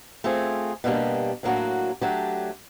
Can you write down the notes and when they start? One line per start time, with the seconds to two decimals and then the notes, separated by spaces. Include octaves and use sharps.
0.24 A3 C4 F4 G#4
0.84 B2 G3 A#3 D4 G4
1.43 A2 F#3 A#3 D4 F#4
2.02 F#3 A3 D4 G4